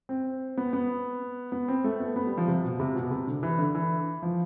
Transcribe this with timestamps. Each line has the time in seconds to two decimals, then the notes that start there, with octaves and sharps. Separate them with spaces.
0.09 C4
0.57 B3
0.73 B3
1.52 B3
1.68 C4
1.84 A3
2.00 B3
2.16 B3
2.26 G3
2.38 F3
2.48 C3
2.63 B2
2.80 C3
2.95 B2
3.11 C3
3.27 D3
3.43 E3
3.59 D3
3.75 E3
4.23 F3